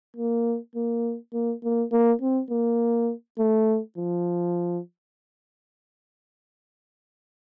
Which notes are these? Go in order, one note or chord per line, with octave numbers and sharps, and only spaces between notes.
A#3
A#3
A#3
A#3
A#3
C4
A#3
A3
F3